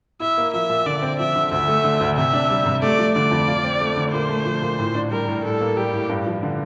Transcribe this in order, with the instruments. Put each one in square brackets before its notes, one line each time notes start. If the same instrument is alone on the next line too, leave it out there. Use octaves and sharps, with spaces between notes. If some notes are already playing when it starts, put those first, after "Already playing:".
[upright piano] E4 [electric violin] E5
[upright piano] A#3
[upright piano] F3 [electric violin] E5
[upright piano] A#2
[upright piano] D3 [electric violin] D5
[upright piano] C4
[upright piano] F3 [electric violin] E5
[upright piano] D3
[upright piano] D2 [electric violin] E5
[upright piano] A3
D3
D2
[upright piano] C3 [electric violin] E5
[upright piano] D4
G3
C3
[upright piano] A3 [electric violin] D5
[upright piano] F3
[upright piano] D3 [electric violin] D5
[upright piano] F2
F4
C4
A3
D3
[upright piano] A#2 [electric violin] C5
[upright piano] A3
F3
A#2
A2
D4
[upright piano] G3 [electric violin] A#4
[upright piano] A2
[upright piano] A2 [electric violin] A4
[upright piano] A#3
[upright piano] G3 [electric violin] G4
[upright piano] A2
G2
F3
D3